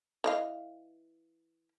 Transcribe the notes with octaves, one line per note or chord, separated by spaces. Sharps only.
E3 D#5 F5